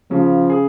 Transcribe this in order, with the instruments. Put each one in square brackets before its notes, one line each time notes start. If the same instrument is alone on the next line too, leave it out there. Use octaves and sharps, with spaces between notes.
[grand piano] C#3 [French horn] F3
[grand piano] G#4